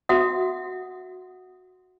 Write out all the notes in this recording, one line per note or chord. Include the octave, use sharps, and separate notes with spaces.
F#4 E5 F#5 D#6